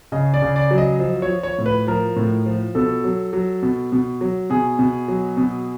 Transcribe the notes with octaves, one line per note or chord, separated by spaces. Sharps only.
C#3 D#5
D5
C#3
D5
F#3
D#5
F3 D#5
C#5
F3
C#5
A2
B4
F3 A#4
A2
F3
B2 A4
F#3
F#3
B2
B2
F#3
B2 G#4
B2
F#3
B2